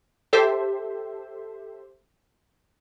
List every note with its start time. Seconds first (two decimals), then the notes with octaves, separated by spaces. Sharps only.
0.33 G4 A4 C5 E5